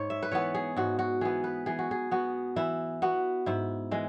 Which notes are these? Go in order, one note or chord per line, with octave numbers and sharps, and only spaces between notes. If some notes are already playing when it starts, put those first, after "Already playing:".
Already playing: G#2 C#5
E5
B4
E3 B3 C#5
G#4
G#2 F#4
F#4
E3 B3 G#4
B4
E3 G#4
F#4
G#4
B3 F#4
E3 E4
B3 F#4
G#2 E4
E3 G#3